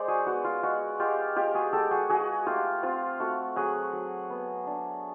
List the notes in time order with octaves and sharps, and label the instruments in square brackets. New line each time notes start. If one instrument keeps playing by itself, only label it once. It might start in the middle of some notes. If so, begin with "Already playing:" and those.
Already playing: [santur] G#3 C5 D5
F#4 G#4
B3 F#4
F4
G#3 F#4
G#3 F4 G4
G#3 F4 G4
F#4 G#4
G#3 G4 A4
F#4 G#4
F4 F#4 G#4
A3 F4 G4
C4 F4
A3 F#4
F#3 F#4 G#4
F#3
B3
D4